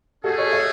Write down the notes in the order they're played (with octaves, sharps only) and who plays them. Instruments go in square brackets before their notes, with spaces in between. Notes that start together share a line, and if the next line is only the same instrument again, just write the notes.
[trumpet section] A3 C#4 G#4 [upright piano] F#4 A4
[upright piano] A4 C#5
C#5 E5